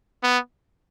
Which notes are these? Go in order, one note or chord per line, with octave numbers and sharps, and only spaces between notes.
B3